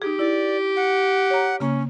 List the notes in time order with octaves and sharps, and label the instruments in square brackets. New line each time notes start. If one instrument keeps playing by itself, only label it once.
[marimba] D#4 G#4 [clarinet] G4
[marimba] E4 [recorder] D5
[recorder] F#5
[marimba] C#5 A#5
[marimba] C#3 A#3 [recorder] C#4